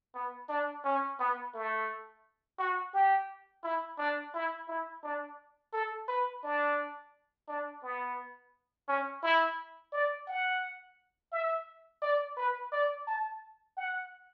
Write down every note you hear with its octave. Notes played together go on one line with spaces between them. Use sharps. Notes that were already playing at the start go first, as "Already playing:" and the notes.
B3
D4
C#4
B3
A3
F#4
G4
E4
D4
E4
E4
D4
A4
B4
D4
D4
B3
C#4
E4
D5
F#5
E5
D5
B4
D5
A5
F#5